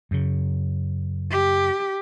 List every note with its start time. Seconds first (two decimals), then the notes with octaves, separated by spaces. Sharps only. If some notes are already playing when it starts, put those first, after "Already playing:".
0.11 F#2 C#3
1.31 G4